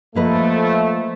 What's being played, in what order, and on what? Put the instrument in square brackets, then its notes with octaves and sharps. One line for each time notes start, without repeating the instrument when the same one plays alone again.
[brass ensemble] F3 A3 [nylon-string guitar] A#3 B4 D#5